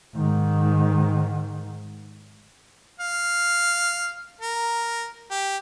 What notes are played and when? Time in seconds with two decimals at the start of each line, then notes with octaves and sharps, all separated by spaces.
0.15 G#2 D#3
3.00 F5
4.41 A#4
5.31 G4